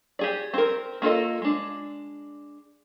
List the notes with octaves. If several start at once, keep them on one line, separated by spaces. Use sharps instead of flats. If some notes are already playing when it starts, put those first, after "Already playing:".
G4 G#4 D5
C4 A#4
A#3 F4 A4 D#5
G#3 D4